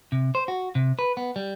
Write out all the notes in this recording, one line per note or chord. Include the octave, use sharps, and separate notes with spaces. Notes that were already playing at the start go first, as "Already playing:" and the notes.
C3
C5
F#4
C3
B4
B3
G3